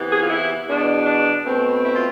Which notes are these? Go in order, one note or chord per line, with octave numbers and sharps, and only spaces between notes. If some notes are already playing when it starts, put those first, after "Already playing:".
Already playing: C3 E3 B3
G#4
F4
E4
E2 B2 B3 D4
D4
B2 A3 C4
E4
F4